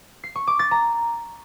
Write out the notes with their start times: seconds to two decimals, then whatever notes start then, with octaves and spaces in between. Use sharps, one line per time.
0.24 C7
0.35 C#6
0.47 D6
0.59 A6
0.71 A#5